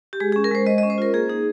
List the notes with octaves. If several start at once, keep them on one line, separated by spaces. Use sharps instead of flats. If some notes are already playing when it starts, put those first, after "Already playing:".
G4
G#3 G#4
G#4
C#4
A#4
G#3 C5
G#3 D#5
D#5
C#4
C5
F4 A#4
A#3 G#4
D#4 G#4